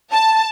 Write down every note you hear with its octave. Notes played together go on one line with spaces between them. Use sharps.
A5